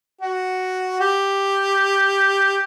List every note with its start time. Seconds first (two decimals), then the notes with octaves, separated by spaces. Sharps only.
0.21 F#4
1.00 G4